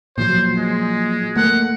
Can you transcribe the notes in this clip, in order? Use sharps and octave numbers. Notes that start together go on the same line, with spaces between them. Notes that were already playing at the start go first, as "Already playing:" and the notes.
A#2 F3 F#3 C5
G#3
A3 A#3 F#5